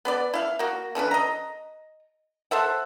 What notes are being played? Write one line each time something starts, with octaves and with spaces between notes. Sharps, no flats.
B3 B4 D5
E4 F5
A#3 F#4
D3 E3 C#4 B4
D#5 A#5
A4 C5 E5 F#5